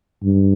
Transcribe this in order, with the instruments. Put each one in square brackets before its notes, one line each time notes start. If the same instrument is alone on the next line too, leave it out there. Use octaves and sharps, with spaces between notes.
[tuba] G2